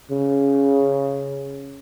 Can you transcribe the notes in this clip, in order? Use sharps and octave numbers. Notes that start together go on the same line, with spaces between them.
C#3